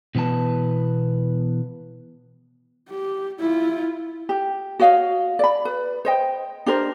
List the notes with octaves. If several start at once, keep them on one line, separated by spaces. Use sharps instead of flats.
B2 E3 B3 B4 A5
G4
E4 F4
G4
F#4 C#5 D#5 F5
D5 B5
B4
C5 D#5 G5
D4 G4 A#4 C5